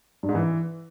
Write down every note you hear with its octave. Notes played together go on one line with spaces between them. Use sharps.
G2
G#2
E3